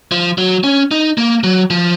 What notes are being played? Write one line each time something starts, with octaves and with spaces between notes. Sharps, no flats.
F3
F#3
C#4
D#4
A#3
F#3
F3